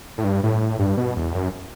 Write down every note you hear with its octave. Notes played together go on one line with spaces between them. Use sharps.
A2
G2
A2
G2
B2
E2
F#2